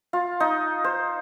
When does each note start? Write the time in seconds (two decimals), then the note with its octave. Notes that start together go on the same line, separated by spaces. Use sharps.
0.13 F4
0.40 D#4
0.84 C5